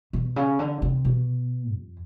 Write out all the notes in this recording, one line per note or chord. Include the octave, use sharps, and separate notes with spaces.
B2
C#3
D3
C3
B2
F2